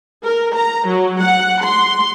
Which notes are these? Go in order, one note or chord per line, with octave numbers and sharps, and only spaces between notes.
A#4
A#5
F#3
F#5
C6